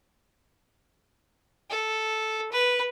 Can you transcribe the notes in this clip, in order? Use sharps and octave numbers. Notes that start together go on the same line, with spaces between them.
A4
B4